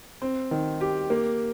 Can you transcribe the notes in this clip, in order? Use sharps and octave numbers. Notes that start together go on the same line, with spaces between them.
C4
D#3
G4
A#3